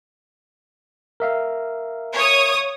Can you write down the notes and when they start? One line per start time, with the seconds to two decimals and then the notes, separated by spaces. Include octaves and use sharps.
1.20 A#4 E5 F5
2.15 C#5 D#6